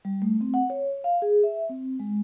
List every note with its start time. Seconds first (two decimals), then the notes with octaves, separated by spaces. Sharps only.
0.05 G3
0.22 A3
0.41 C4
0.54 F#5
0.70 C#5
1.04 F5
1.22 G#4
1.43 E5
1.69 C4
1.99 G#3